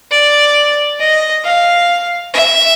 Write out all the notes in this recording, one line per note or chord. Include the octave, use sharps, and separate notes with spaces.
D5
D#5
F5
E5